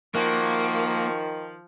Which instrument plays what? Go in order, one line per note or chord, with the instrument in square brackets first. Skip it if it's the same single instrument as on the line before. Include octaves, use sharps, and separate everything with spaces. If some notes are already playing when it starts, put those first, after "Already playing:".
[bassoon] D#3 [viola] F3 [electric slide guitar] A#3 [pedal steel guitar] F#4